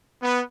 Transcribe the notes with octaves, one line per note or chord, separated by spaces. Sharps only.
B3